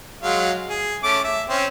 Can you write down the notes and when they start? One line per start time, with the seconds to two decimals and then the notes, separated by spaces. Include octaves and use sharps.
0.22 F#3 G#3 F5
0.70 G#4
1.03 A3 C#4 D6
1.24 E5
1.49 C4 C#4